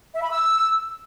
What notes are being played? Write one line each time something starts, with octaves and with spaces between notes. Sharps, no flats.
E5
B5
E6